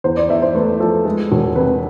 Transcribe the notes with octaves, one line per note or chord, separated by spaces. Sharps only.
E2 C5
D5
E2 E5
C5
A3 B4
F3 A4
G#3
E1
C3 B4